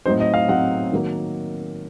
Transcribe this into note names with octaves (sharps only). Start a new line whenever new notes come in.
A2 F#3 C4 D#4 C5
D#5
F5
A2 F#3 C4 D#4 F#5
D#3 F#3 A#3